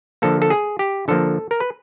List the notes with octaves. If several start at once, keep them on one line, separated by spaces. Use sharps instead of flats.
D3 F3 A#3 A4
A4
G#4
G4
D3 F3 A#3 A4
A#4
B4